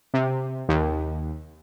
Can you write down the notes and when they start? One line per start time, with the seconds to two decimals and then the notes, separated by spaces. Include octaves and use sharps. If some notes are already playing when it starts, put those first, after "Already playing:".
0.14 C3
0.69 D#2